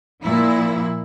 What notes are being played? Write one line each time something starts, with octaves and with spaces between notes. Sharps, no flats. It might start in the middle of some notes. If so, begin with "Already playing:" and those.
A#2 F3 E4